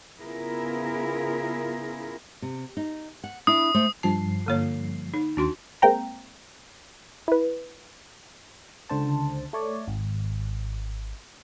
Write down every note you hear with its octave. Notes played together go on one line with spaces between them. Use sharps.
C#3 B3 E4 F4 G#4 A#4
C3
D#4
F#5
D4 E4 D#6
A3 C5
G2 F3 A5 C7
D3 A#3 C#5
D#4
D#2 D4 F#4 C6
G#3 A#3 C4 G5 A#5
E4 B4
C#2 D3 C5 A5
A3 C#5 D5
G#1